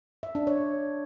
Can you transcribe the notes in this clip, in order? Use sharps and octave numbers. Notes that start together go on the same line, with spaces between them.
E5
D4
C#5